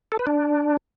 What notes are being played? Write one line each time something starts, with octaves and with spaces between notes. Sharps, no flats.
A4
B4
D4